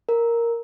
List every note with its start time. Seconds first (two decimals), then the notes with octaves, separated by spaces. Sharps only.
0.09 A#4